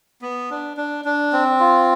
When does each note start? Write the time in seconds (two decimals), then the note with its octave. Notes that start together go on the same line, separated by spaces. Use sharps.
0.22 B3
0.50 D4
0.77 D4
1.05 D4
1.33 C4
1.60 F4